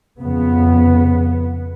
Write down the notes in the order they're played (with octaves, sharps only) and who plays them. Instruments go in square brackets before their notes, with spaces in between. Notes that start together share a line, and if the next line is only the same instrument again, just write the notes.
[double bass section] F2 C#3 B3